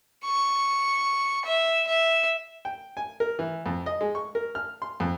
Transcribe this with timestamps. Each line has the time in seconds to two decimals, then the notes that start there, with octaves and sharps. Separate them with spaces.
0.25 C#6
1.46 E5
1.87 E5
2.65 G5
2.97 G#5
3.20 A#4
3.39 E3
3.66 F2
3.86 D#5
4.01 G#3
4.15 C#6
4.35 A#4
4.55 F6
4.82 C6
5.00 F2